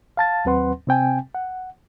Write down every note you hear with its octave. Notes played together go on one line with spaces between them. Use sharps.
F5 A5 A6
D#2 F#3 C4 B4 F#5 C6
C3 C4 G5 G#5
F#5